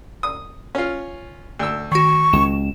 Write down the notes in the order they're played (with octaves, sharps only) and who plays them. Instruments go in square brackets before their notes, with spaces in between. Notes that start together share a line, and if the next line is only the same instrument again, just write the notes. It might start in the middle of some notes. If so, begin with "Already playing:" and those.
[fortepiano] D#6
C#4 F4
D2 E6
[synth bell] D#3 F#4 [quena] C#6
[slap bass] C#2 [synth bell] E7